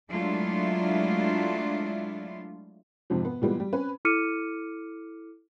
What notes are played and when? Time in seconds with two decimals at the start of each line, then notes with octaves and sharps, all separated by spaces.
0.12 F#3 G#3 A3 D4 E4 F4
3.10 F2 G#2 C3 F3
3.25 B3
3.42 A#2 E3 G3 G#3 B3
3.60 G3
3.73 C4 C#4 B4
4.05 E4 A4 D6 F6 C#7 D#7